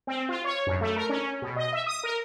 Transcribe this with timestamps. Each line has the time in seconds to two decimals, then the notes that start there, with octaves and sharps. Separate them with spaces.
0.07 C4
0.29 F4
0.44 C#5
0.67 F#2
0.81 A3
0.96 A#4
1.09 C#4
1.42 B2
1.56 D#5
1.73 E5
1.87 D#6
2.03 A#4